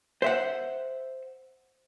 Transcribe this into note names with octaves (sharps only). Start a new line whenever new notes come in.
C5 E5 F#5